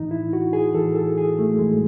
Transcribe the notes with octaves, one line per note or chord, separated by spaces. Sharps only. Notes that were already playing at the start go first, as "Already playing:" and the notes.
Already playing: A2 E3 D#4
E4
F#4
G#4
A2 E3 A4
A4
G#4
A3
A2 E3 G#3